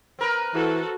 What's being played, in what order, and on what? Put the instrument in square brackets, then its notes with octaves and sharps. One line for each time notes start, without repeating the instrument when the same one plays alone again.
[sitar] C4 A#4 B4
[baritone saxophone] E3 [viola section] F#4 A4